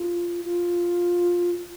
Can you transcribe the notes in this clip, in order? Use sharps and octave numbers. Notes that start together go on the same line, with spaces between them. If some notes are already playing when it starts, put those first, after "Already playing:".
Already playing: F4
F4